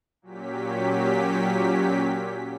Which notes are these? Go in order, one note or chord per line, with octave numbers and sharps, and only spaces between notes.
A#2 F#3 C#4 G4 B6